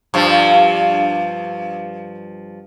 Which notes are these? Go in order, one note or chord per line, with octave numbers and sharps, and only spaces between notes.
G2 F3